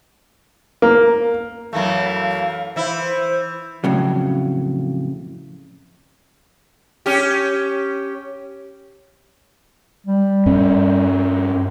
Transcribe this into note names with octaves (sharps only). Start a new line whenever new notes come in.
A#3
F#2 E3 A3 F5
E3 E4 C5
F2 A2 C#3 F#3
C#4 G4
G3
G2 C#4